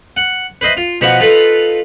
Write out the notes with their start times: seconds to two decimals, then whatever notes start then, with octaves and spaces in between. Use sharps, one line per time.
0.17 F#5
0.61 B4 C5 D#5 E5
0.77 F4
1.01 B2 F3 B3 F#4 B4
1.20 D#4 F4 A4 B4